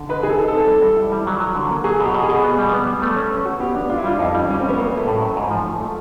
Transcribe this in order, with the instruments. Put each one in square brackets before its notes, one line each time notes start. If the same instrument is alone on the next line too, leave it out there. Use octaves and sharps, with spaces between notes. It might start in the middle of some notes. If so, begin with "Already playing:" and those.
Already playing: [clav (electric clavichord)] D3
[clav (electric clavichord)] D#4 [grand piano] B4
[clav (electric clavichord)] D#4 [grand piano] G#4
[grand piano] A4
[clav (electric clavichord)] D#4
[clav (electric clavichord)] C4 [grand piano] A4
[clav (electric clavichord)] G3
G3
E4
G3
F#3
F#3
D3
A#3
[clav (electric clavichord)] F#3 [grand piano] G#4
[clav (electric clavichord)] B2 [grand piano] G4
[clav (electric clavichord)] B2
[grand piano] G#4
[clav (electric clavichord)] B2
B3
G3
B3
G3
A3
C#4
B4
F#4
[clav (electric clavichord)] B3 [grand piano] G4
[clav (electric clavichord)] D4
[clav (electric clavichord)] D4 [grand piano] F4
[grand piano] E4
[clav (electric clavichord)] G3 [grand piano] F4
[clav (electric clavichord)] F2 [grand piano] D#4
[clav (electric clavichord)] G3 [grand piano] C#4
[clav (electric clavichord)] G3 [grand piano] C#4
[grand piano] C4
[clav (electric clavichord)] G3
[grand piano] B3
[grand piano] A#3 [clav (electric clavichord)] C#4
[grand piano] A3 [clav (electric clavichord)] C#4
[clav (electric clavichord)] A2
F#3
G#2
F3
A3
A3